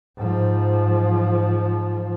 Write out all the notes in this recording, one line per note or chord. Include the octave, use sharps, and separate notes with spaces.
G#2 F3